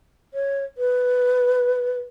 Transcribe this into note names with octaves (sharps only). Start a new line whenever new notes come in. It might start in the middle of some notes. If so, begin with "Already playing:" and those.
C#5
B4